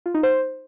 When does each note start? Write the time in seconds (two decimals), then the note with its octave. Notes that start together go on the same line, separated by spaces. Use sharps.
0.06 F4
0.14 D#4
0.23 C5